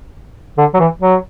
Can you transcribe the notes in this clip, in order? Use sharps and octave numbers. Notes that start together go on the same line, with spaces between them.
D3
F#3
E3
F#3